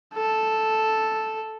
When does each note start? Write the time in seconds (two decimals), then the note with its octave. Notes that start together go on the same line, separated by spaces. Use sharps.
0.14 A4